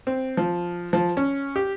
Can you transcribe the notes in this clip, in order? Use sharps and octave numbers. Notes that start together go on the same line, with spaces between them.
C4
F3
F3
C#4
G4